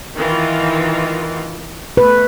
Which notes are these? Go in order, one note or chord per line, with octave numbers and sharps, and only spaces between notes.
D#3 E3 F4
A3 B4